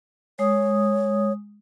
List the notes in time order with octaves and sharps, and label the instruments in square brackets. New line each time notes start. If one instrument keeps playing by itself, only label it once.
[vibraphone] G#3 D#6 [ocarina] C#5